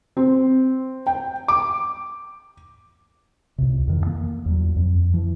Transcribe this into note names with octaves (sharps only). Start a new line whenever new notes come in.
C4
G5
D6
C#2 C3
F2 D#3 E3
A#3
E2 F#3
F2
E3 F3